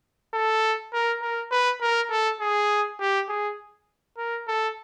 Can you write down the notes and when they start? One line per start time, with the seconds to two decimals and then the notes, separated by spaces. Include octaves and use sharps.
0.34 A4
0.93 A#4
1.22 A#4
1.51 B4
1.81 A#4
2.10 A4
2.41 G#4
3.00 G4
3.29 G#4
4.18 A#4
4.48 A4